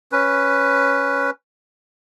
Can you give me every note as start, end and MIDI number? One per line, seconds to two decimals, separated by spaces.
0.12 1.30 61
0.12 1.30 71